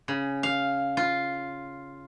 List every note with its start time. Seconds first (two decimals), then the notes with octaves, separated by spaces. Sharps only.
0.08 C#3
0.43 F5
0.97 F4